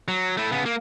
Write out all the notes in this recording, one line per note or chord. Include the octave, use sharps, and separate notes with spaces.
F#3
A3 E4
C#3 B3
A#3